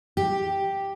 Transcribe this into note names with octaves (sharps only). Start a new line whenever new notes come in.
G4